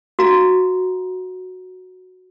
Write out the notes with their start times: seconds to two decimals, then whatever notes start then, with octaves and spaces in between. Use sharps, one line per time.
0.19 F#4 F5 A#5